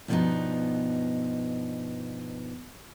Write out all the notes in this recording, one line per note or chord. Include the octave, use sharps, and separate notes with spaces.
G2 B2 F3 G#3 B3 D#4